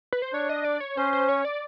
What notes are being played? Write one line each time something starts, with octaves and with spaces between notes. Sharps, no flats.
B4
C5
D4 C#5
D#5
D5
C#5
C#4 C5
C5
C#5
D5